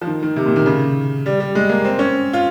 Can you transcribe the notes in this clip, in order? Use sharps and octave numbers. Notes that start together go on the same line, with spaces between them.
F3
D#3
D#3
C3
A#2
D#3
C#3
G3
G3
G#3
A#3
C4
C#4
F4